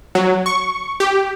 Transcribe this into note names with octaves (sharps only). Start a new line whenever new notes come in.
F#3
C#6
G4